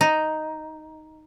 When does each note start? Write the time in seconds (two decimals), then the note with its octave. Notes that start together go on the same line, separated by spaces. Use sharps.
0.01 D#4